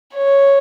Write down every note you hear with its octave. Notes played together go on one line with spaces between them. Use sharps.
C#5